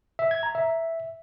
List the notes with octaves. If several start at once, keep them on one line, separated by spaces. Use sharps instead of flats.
E5
G#6
A#5
E5